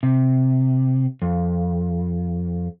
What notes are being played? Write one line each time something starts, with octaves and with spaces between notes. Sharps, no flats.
C3
F2